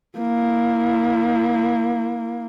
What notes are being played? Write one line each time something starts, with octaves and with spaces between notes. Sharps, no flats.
A#3 E4